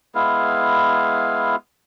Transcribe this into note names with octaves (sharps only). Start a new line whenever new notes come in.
G#3 B3 E4 F5